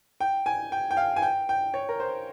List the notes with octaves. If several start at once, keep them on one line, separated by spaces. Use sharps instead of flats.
G5
G#5
G5
G5
F5
G#5
G5
G5
C#5
A#4
C5